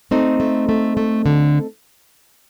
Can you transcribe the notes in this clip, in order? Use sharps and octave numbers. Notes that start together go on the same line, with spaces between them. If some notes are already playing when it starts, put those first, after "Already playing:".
A3 C4 D#4
A3
A3
A3
D3